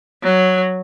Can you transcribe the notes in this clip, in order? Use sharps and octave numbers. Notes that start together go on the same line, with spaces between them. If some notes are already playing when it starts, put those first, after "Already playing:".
F#3